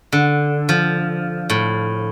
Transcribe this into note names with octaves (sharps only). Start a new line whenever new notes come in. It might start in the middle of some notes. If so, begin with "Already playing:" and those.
D3
F3
A2